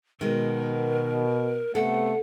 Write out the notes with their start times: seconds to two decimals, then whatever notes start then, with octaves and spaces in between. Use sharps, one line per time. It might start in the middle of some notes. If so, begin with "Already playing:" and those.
0.21 B2 D#3 G#3 A#4
1.75 C3 A3 B3 A4 F#5